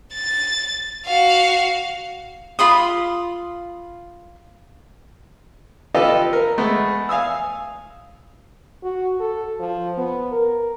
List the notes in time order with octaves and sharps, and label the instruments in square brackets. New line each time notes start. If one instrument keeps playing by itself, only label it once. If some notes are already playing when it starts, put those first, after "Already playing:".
[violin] A6
F#4 F5
[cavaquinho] F4 B5 C6 D#6
[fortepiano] F4 G4 A4 B4 D#5 F5
A#4
G#3 A3 B3
F5 G#5 D#6 E6
[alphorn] F#4
A4
F3
B3
A#4